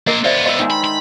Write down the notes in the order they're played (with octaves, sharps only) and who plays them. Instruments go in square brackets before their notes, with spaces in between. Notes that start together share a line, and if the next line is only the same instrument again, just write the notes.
[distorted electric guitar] A#3 C5 [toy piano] A#4 D#5
[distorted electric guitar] B3 F4 [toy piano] C5 D5 E5
[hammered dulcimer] C5 E5 [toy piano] D#5
[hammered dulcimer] D#3 G#3
[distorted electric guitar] B5
B5